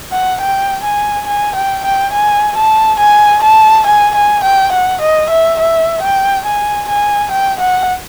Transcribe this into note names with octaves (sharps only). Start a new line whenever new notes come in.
F#5
G5
G#5
G#5
G5
G5
G#5
A5
G#5
A5
G#5
G#5
G5
F#5
D#5
E5
E5
G5
G#5
G#5
G5
F#5